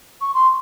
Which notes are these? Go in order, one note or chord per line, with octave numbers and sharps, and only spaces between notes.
C#6
C6